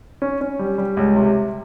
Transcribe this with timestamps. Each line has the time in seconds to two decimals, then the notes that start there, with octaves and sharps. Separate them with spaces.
0.22 C#4
0.41 C#4
0.59 G3
0.78 G3
0.97 C#2
1.16 C3